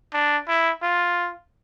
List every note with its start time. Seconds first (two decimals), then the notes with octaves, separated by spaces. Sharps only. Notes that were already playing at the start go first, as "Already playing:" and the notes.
0.14 D4
0.48 E4
0.82 F4